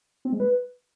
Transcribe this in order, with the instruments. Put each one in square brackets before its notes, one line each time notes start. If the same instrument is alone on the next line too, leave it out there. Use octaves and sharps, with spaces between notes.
[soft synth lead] C4
G#3
B4